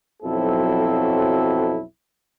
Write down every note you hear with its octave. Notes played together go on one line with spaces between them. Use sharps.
B1 F2 F#3 C4 E4 A4